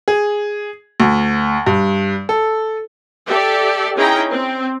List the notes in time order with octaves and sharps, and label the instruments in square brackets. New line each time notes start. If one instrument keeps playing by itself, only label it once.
[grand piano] G#4
D2
G2
A4
[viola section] G4 A4 D5 E5
C#4 D#4 E4 G#4 G5 A#5
C4